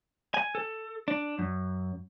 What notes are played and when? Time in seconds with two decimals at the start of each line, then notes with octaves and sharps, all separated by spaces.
0.34 G#5
0.55 A4
1.08 D4
1.39 F#2